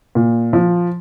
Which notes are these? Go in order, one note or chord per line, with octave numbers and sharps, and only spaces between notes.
A#2
F3